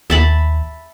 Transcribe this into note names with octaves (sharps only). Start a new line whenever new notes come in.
D#2 E5 A5 B5